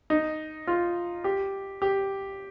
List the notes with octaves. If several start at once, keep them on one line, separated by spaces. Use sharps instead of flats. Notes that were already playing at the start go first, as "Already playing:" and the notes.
D#4
F4
G4
G4